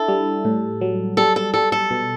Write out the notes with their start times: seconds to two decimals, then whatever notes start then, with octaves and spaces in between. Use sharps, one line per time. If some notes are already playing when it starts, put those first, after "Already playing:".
Already playing: D4 E4 A4
0.08 G3
0.45 A2
0.81 F#3
1.17 G3 A4
1.36 A4
1.54 G3 A4
1.72 A4
1.91 B2